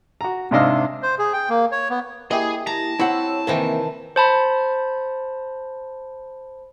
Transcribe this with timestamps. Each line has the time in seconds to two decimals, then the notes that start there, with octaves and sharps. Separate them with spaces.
0.21 F#4 A#5
0.51 G#2 C3 D4 D#5 F5 E6
1.03 C5
1.19 G#4
1.33 G5
1.50 A#3
1.72 C#5
1.90 B3
2.31 A#3 E4 G4 G#4 D#5
2.67 A5 A#5
2.99 C4 E4 C#5 F#5 E6
3.47 C3 D#3 E3 A#3 C4
4.16 C5 A5 B5